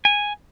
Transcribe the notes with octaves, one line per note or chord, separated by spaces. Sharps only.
G#5